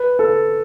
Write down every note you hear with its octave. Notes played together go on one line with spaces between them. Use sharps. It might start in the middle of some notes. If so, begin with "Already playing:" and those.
Already playing: B4
A4